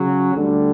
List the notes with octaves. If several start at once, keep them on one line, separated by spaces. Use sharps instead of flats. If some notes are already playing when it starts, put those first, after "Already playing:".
Already playing: C#3 F#3 C#4
D2 D3 G3